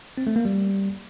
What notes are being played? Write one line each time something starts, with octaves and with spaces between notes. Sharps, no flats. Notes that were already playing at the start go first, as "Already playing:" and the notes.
C4
A3
A#3
G3